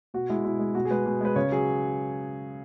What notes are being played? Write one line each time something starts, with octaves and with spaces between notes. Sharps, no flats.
B2 F#4
G#3 E4
B2 E4
G#3
B2 F#4
G#4
G#3 B4
B2
G#3 B4
C#3 C#5
F#3 G#4